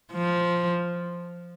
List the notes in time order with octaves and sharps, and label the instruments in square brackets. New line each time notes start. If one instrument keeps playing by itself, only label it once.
[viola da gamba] F3